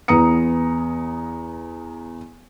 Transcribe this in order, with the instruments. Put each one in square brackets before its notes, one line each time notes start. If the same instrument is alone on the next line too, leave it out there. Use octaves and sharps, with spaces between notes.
[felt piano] E2 B3 A#5 D#6 C#7